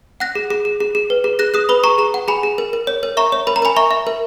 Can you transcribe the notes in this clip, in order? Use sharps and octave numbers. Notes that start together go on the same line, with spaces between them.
F#5 F#6 A#6
G#4
G#4
G#4
G#4
G#4
B4
G#4
G#4 F#6 A#6
G#4 D#6 F#6
B4 B5 D#6
G#4 A#5 C#6
G#4 A#5
F#5
G#4 G#5 B5
G#4
A#4
A#4
C#5
A#4
E5 A#5 C#6
C#5
A#4 B5
A#5
A#4 G#5 B5
E5 A#5 C#6
E5
A#4